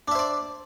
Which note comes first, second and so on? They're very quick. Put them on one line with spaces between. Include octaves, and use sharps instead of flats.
D4 E5 C5 D5